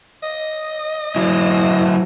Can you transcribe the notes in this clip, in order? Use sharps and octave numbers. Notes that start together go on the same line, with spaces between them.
D#5
F#3 E4